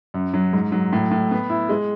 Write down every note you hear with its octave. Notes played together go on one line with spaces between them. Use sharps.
F#2
F#3
G#2
F#3
A2
A2
B3
E4
G#3